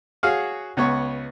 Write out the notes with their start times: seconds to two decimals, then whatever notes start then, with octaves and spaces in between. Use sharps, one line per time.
0.23 F#4 G#4 C#5 F5
0.77 C#2 B3 C#5 C#6